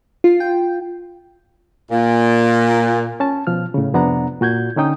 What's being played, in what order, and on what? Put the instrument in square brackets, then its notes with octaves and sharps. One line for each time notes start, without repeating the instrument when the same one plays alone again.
[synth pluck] F4
G5
[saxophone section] A#2
[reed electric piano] C#4 A5
B2 F3 F6
A2 C#3
F2 C3 B3 D4 F#5 A#5
A#2 F#4 G6 G#6
D3 C#4 D#4 G5 D#6